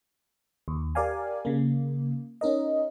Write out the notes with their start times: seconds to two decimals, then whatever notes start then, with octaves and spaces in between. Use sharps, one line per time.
0.68 D#2
0.95 G4 A#4 D5 F5 G#5
1.45 C#3 A#3
2.41 C#4 D#4 A#4 D#5